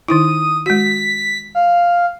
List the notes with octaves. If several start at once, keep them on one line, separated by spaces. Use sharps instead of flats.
D#3 D#4 E4 D#6
G#3 F#4 B6
F5